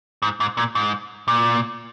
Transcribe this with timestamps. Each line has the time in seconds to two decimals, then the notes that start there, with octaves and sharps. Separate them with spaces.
0.22 G#2
0.40 G#2
0.57 A#2
0.75 G#2
1.28 A#2